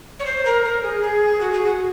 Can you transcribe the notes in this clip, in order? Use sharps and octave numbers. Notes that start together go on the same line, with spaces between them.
C#5
C5
A#4
A#4
G#4
G#4
F#4
G#4
F#4